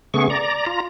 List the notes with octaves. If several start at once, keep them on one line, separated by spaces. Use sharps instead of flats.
C#3 A3 B3 G#4 C#6
D5 A#5
F4 A#5